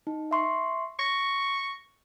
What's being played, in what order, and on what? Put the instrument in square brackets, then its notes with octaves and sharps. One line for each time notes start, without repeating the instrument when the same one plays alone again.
[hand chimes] D#4
E5 C6 C#6
[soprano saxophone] C#6 [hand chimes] A#6